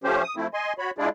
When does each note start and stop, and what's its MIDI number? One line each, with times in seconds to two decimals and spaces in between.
0.04 0.23 53
0.04 0.23 57
0.04 0.23 61
0.04 0.23 67
0.04 0.23 72
0.23 0.35 87
0.36 0.47 53
0.36 0.47 57
0.36 0.47 60
0.36 0.47 64
0.54 0.73 75
0.54 0.73 80
0.54 0.73 84
0.78 0.91 66
0.78 0.91 73
0.78 0.91 83
0.98 1.09 56
0.98 1.09 62
0.98 1.09 64
0.98 1.09 65
0.98 1.09 68
0.98 1.09 74